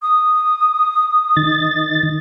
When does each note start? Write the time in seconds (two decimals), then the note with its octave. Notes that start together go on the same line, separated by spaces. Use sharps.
0.01 D#6
1.36 D#3 A6